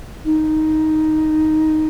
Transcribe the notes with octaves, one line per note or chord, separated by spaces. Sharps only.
D#4